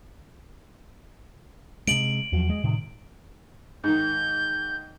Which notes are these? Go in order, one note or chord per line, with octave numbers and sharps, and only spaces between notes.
C3 G#3 D7 F#7
E2 F3 F#3
G#3
A2 C3 D#3
G#2 D#3 G6